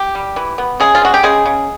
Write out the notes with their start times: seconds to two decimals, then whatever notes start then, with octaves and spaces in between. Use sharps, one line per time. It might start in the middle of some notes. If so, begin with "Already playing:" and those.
Already playing: G4
0.15 G3
0.36 E3
0.58 B3
0.80 C#3 G#3 G#4
0.95 F4
1.02 G#3 F#4
1.14 G4
1.23 C#3 G#3 G#4
1.45 C#3